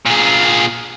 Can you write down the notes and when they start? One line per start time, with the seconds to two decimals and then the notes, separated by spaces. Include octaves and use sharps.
0.06 A#2 G#4